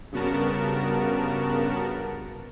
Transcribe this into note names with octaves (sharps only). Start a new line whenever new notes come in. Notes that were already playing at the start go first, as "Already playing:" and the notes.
G2 C#3 B3 F#4 A#4 A5